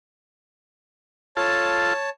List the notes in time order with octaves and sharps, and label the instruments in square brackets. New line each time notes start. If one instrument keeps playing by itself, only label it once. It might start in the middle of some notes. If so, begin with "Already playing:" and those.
[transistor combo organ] F4 A4 [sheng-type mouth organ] C#5 A5